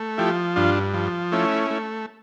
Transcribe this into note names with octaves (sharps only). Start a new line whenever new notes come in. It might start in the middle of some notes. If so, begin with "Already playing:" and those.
Already playing: A3
F3 E4 G4
G2 D4 F4
F3
A3 C#4 E4
A3